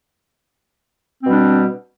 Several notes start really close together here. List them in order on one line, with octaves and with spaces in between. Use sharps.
C4 B2 G3 D4